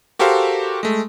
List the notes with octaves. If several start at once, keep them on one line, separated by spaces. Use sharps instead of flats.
F#4 G4 A4 A#4 C5 F5
G#3 A3